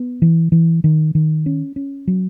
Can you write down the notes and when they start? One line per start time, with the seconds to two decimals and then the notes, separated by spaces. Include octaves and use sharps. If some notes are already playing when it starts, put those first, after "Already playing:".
Already playing: B3
0.22 E3
0.52 E3
0.84 D#3
1.15 D#3
1.46 C#4
1.76 C#4
2.07 F#3